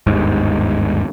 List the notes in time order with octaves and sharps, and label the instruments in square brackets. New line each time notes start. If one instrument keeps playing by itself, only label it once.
[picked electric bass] G1 D#2 G#2